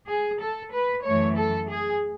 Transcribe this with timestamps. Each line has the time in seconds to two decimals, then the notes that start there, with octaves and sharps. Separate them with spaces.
0.09 G#4
0.41 A4
0.73 B4
1.05 F#2 E3 A3 C#5
1.37 A4
1.69 G#4